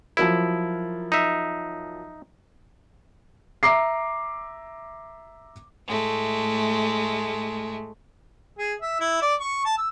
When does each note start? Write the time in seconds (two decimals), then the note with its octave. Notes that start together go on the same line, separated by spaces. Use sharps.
0.17 F3 F#3 E4 A#4
1.12 D#4 E5
3.63 E5 A#5 D6 C7
5.86 A2 G#3 A3
8.59 G#4
8.82 E5
9.00 E4
9.22 D5
9.40 C#6
9.65 A5
9.78 E6